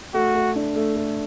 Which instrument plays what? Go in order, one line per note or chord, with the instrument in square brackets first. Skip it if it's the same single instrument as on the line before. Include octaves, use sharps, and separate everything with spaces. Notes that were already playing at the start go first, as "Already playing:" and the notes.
[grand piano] A3 [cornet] F#4
[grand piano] A3
D4
A3
A3